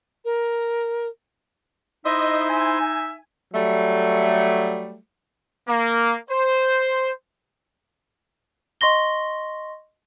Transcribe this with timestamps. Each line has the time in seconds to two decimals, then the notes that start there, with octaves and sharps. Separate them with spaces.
0.25 A#4
2.05 D#4 E4 C5 D#5 E5 C6
2.49 E5 G#5
3.54 F#3 G3 A3
5.68 A#3
6.30 C5
8.81 D#5 C6 C#6 A#6 G7